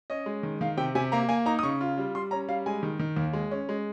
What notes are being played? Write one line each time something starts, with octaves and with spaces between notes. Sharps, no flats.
C#4 D#5
G#3
D#3
D#3 F5
C3 G5
C3 G#5
A#3 A#5
A#3 G#5
D#4 A#5
D#6
C#3 C#6
F4
G3
G3 C6
C#4 A#5
G3 F5
G#3 G#5
D#3
D#3
D#2
G#3
C#4
G#3